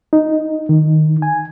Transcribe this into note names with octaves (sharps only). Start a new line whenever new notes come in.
D#4
D#3
G#5